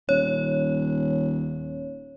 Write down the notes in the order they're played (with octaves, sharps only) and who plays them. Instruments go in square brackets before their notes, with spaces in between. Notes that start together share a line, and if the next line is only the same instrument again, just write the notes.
[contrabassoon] D#1 [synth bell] C#5